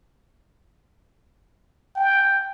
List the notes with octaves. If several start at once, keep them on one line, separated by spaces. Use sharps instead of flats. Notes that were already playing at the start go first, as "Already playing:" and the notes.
G5